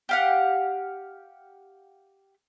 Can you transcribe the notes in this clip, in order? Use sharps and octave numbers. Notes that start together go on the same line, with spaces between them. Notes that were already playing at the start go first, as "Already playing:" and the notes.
G4 F5 F#5